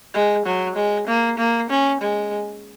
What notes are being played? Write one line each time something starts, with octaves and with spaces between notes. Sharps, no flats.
G#3
F#3
G#3
A#3
A#3
C#4
G#3